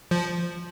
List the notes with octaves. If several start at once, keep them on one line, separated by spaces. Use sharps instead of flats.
F3